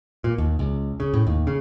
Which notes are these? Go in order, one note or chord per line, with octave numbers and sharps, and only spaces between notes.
A#2
D#2
C#2
C#3
A2
D#2
C#3